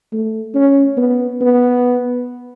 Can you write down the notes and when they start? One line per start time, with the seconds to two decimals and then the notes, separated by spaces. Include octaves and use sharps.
0.13 A3
0.55 C#4
0.97 B3
1.41 B3